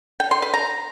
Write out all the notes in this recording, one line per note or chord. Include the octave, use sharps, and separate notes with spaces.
G5
C6
B4
A#5